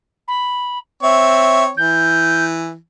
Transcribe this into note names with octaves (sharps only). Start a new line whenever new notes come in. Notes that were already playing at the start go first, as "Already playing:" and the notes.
B5
C4 C#5 E5
E3 G6